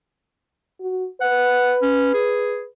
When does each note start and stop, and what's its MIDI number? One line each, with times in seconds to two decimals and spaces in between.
0.80 1.06 66
1.21 2.67 71
1.21 1.74 78
1.82 2.09 61
2.14 2.65 68